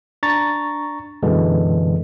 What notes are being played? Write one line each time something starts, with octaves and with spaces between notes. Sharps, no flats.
D4 A#5 C#6 A6
F#2 B2 D3 E3 G#3